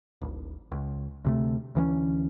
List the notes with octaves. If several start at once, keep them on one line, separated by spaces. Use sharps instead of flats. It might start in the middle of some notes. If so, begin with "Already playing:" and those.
D1 G#1
C#2
D2 C3 A3
D2 E3 A#3 C#4